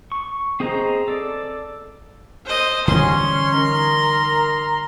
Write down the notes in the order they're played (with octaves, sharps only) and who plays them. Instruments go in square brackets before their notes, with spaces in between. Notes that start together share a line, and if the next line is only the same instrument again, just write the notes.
[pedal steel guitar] C#6
C4 G#4 C5 D#5 A#5
A4 D5
[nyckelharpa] C5 D#5
[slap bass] D3 E3 G3 [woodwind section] C#4 [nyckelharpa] C6
[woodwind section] D#4 A#4 A#5